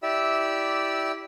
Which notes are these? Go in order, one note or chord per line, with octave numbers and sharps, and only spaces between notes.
E4 G4 D5 E5 E6